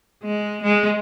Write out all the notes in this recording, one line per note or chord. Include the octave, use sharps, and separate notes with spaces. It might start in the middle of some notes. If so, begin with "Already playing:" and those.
G#3
G#3